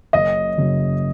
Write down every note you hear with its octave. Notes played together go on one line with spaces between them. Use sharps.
F#1 F#2 C#3 F#3 D#5
F#1 F#2 C#3 F#3